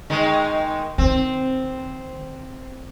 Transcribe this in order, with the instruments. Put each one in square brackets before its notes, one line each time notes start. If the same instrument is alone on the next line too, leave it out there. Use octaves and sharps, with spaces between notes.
[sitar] D#3 G#3 D#4
[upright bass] D#3 [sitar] C4